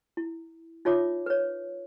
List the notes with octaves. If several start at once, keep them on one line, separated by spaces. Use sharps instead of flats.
E4
D#4 F4 C#5 E5 D6
B4 C#5